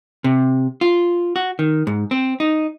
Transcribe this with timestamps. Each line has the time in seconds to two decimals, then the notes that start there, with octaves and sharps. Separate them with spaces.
0.24 C3
0.81 F4
1.36 F#4
1.59 D#3
1.87 G#2
2.11 C4
2.40 D#4